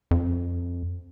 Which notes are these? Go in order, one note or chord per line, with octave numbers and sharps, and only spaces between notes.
F2